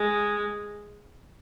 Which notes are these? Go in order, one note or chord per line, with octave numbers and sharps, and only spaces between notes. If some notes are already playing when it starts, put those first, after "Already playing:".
Already playing: G#3